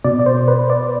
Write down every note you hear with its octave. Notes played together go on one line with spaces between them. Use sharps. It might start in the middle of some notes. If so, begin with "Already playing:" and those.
B2 D5
D5
C5
B4
D5